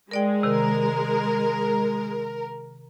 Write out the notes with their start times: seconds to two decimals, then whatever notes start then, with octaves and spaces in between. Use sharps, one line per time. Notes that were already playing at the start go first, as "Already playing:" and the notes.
0.11 G#3 A#4 D5 G5
0.43 C3 D#3 A#4